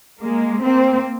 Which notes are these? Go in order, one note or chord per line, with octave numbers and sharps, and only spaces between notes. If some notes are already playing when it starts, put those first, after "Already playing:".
G#3 A#3
A#3 C4